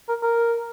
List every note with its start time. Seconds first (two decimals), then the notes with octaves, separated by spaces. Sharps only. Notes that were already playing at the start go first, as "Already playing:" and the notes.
0.09 A#4
0.23 A#4